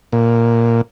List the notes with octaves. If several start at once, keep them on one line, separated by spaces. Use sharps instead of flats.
A#2